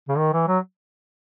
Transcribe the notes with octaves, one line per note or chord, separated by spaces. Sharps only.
C#3
D#3
E3
F#3